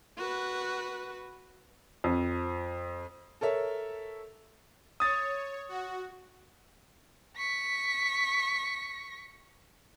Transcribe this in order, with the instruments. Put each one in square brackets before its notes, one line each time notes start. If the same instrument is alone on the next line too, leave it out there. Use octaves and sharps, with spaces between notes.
[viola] F#4 B4
[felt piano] F2
[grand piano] A4 A#4 C#5 E5
[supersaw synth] C#5 [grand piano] D#6 A6
[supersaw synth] F#4
[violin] C#6 B6